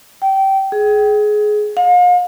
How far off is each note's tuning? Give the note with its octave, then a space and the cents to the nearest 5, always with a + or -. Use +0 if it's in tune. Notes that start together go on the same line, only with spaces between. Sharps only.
G5 -20
G#4 +20
F5 +40